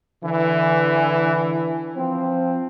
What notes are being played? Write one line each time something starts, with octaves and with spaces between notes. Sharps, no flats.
D3 E3
F3 C4